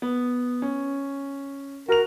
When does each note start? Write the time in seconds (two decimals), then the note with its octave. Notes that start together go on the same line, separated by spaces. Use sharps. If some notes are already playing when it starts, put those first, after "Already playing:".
0.02 B3
0.62 C#4
1.89 F#4 A#4 F7